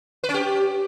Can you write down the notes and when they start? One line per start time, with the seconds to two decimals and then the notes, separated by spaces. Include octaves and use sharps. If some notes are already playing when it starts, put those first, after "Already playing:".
0.24 B4
0.29 C#4
0.34 G4